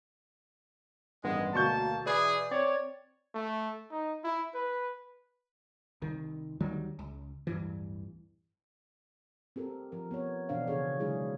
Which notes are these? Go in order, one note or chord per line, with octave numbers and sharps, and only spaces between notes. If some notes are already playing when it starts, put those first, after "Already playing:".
A1 G2 D#3 G#3 B3
D2 B2 A#3 A5 C#6 G6
E3 G#4 B4 D5
C4 C#5 D5
A3
D#4
E4
B4
C2 D#3
D2 D#3 F#3 G3
C#2
D1 G2 E3
C4 G4 A4 A#4
F3 A#4
B3 C4 C#5
B2 E3 D4 C5 F5
C#3 E3 D4 G#4 A4 C#5
D3 F#3 G#3 D4 E4 G#4